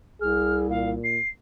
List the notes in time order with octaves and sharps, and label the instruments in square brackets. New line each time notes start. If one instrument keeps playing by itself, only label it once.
[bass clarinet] C2 [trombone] G#4 [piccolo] F6
[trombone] A#2 [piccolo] F5
[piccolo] C7